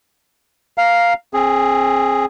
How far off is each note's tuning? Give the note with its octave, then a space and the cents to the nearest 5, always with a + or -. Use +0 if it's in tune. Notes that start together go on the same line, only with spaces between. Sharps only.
F5 +0 A#5 +0
C4 +30 G#4 +0